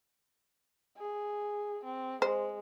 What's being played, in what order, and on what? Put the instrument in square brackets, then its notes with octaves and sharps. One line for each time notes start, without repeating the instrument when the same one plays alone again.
[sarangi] G#4
C4
[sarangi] G#3 [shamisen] C5